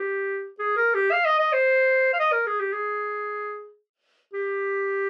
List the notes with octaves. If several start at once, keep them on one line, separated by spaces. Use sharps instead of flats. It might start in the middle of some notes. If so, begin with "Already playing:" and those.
Already playing: G4
G#4
A#4
G4
F5
D#5
D#5
C5
F5
D#5
A#4
G#4
G4
G#4
G4